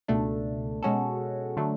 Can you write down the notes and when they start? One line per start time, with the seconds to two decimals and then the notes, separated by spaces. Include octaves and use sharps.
0.08 C#2 B2 A3 D4
0.82 B2 G#3 C#4 F#4 A4
1.57 D3 F#3 A3 D4